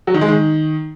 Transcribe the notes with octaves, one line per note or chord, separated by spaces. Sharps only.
F#3
D#3
G#3
D#3